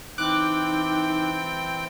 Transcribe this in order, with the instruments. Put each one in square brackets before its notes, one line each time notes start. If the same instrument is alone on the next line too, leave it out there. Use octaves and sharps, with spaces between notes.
[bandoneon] E3 C4 [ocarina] D#4 [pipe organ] G5 [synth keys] D6 F#6